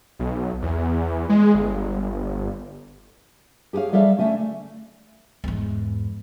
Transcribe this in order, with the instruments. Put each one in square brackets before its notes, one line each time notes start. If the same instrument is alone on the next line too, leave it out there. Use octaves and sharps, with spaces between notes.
[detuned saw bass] B1
E2
G#3
G1
[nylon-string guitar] G4 G#4 B4 C#5 F5
G3 A4 C#5 E5 F5
D3 A3 C#4 E5
[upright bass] E2 G#2